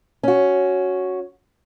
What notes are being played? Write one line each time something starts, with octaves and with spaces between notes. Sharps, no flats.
C#4 F#4